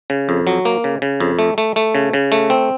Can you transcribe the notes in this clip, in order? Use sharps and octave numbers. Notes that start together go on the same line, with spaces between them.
C#3
F2
F#3
A#3
C#3
C#3
F2
A3
A3
A3
C#3
C#3
A3
C4